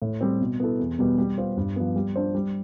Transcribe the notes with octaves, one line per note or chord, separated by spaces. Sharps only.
A2
G3 C4
B2
B3 E4 A4
E2
B2 G3 B3
G3
B3 F4 C5
G2
F3 B3
G3
D4 F4 C5
G3